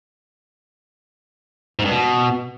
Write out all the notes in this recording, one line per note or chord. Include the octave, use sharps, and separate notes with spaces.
G#2
G2
B2